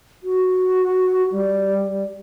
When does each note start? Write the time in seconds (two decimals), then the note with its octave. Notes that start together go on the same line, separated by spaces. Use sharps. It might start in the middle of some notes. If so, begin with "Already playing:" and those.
0.23 F#4
1.32 G3